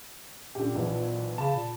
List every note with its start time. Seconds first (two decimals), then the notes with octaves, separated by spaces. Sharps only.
0.55 A#2 D3 G4
0.75 B1 E3 F3
1.38 C#3 A5 B5
1.56 A#2